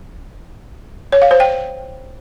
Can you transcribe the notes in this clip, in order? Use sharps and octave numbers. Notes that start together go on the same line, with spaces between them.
C#5
F5
C5
G5